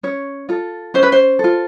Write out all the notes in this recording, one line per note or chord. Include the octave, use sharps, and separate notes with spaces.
C#4 C#5
F4 A4
C#4 C5
B4
C5
F4 A4